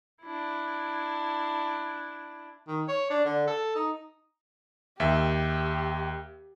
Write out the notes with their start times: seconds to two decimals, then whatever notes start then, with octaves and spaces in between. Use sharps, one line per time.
0.23 D4 E4
2.68 D#3
2.88 C#5
3.10 D4
3.25 D3
3.47 A4
3.76 D#4
5.00 D#2 G4 E5